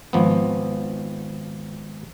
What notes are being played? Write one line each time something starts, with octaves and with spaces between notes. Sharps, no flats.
G#1 F3 B3